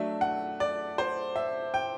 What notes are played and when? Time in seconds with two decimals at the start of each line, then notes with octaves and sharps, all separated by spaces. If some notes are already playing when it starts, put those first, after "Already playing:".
Already playing: F#3 A3 D4 E5
0.21 F#5
0.60 D5
0.98 C5
1.36 E5
1.74 G5